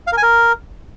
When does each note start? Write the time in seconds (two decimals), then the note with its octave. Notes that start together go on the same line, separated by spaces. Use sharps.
0.07 F5
0.12 A#4
0.17 G#5
0.23 A#4